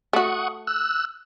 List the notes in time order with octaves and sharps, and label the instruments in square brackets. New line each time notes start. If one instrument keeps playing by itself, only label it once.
[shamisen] A3 F#4 [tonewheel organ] F#5 C#6 D#6
[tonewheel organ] E6 F#6